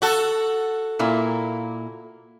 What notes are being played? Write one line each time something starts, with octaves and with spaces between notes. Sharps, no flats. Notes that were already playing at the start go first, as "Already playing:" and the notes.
F#4 A4
A#2 A#3 E4